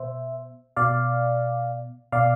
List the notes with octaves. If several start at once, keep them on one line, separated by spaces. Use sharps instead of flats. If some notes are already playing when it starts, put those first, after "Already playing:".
Already playing: B2 C5 E5
B2 D5 F5
B2 D5 F5